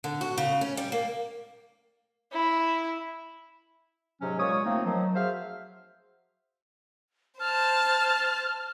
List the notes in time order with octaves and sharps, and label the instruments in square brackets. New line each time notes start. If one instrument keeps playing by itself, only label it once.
[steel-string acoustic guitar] D3
F#4
C#3
C#4
G3
A#3
[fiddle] E4
[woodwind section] G#2 C3 F#3 C#4
A#2 G#3 C#5 C#6 D#6
F3 A3 A#3 C4 D#4
D#3 F3 F#3
F#4 G#4 C5 E5 F5
[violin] C5 A5 [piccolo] F6